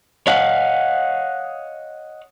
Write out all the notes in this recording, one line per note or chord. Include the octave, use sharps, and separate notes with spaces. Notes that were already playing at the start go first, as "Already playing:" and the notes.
C#5 D#5 F5 F#5